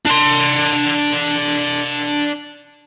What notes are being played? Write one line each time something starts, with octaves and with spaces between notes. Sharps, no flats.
D4 C6